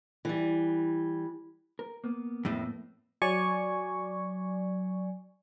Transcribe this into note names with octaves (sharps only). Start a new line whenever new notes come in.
E3 G3
A#4
A#3 B3
F2 A2
F#3 D5 G#5 C#6